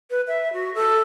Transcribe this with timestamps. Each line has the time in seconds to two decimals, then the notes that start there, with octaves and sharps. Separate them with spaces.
0.10 B4
0.28 E5
0.53 F#4
0.75 A4